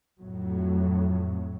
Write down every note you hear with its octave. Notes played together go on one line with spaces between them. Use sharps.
F2 A2 F#3